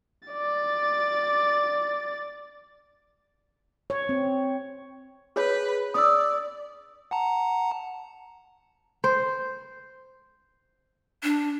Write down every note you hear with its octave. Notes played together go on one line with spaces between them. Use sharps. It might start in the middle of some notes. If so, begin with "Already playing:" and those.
D5 A6
C#5
C4
G#4 B4 C#5
D5 D#6 E6
F#5 A5 A#5
C5
D4